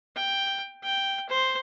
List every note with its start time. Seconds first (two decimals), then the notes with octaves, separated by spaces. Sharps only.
0.16 G5
0.83 G5
1.29 C5